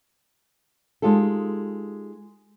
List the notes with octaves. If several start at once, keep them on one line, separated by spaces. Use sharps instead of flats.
G#3 D#4 F4 G4 A4